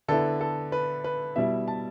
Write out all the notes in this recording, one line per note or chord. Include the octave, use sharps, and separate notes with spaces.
D3 B3 E4 A4
A4
B4
B4
B2 G3 E4 E5
A5